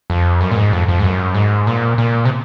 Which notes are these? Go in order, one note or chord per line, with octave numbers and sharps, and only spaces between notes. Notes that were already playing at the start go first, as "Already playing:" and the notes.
F2
F#2
A#2
G#2
F2
F2
G#2
F#2
G#2
A#2
A#2
C3